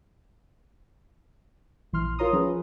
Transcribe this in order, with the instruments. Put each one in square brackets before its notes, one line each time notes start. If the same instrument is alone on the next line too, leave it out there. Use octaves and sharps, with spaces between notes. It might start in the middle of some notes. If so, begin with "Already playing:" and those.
[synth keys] A#1 E3 C6 F6
F4 A#4 C#5 A#5 C6 D#6
F3 C#4 F4 G#4 B4